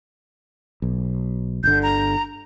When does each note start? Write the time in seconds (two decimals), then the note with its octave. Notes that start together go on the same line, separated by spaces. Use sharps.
0.82 B1
1.64 G1 D3 G6
1.83 A#5